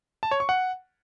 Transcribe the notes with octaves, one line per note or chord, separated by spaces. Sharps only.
A5
C#5
C#6
F#5